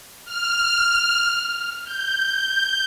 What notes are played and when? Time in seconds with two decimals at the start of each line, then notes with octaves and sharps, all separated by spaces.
0.25 F6
1.84 G6